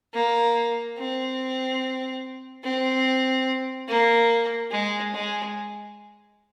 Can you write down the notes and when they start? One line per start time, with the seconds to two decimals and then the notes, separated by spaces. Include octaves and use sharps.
0.14 A#3
0.98 C4
2.64 C4
3.88 A#3
4.71 G#3
5.13 G#3